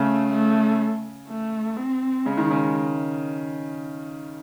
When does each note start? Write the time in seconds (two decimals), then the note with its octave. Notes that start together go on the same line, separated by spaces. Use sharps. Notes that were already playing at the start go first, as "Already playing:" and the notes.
Already playing: C#3 A3
0.33 A3
1.29 A3
1.77 C4
2.26 C#3 G#3
2.37 D#3
2.51 C#3